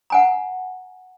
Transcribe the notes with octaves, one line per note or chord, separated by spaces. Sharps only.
F#5 G#5 A#5